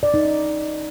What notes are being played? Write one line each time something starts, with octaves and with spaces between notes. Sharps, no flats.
D5
D#4
C#4